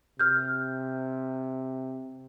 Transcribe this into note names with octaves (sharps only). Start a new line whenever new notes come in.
C3 F6 G6